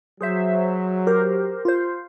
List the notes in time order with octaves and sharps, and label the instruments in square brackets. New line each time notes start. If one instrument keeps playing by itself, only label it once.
[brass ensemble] F#3 [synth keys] G#4 C5 E5
[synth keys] G4 A#4 C5
F4 C5